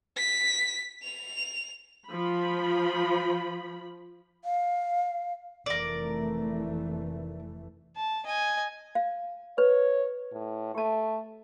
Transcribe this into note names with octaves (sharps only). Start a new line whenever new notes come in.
B6
F7
F3 B5
F5
F1 E3 A3 A#4 D5
A5
D#5 G#5
F5
B4 C#5
A2
A3 G4 A5